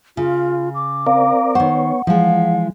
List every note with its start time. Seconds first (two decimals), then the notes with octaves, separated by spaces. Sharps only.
0.17 C#3 F4
0.75 D6
1.07 C4 A#4 D5 F5
1.55 D#3 B3 C5 C#5 F#5
2.07 E3 F3 G#3 F5